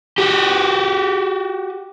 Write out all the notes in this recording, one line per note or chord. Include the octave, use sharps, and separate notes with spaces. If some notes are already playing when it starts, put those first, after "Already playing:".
F#4 G4